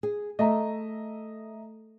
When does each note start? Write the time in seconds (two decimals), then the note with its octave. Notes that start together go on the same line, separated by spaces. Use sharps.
0.03 G#4
0.39 A3 D#5 E5 A#5